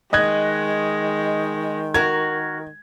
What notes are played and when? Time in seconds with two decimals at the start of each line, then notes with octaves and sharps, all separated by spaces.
0.13 D#3 G#3 D#5 F#6 G#6
1.94 F#4 A#4 G#6